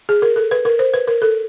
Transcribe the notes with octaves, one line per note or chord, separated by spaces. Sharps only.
G#4
A#4
A4
B4
A#4
C5
B4
A#4
A4